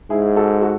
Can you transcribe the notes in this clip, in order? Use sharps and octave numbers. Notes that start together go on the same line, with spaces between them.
G#2 E4 G#4
F#4 A4
F#4 A4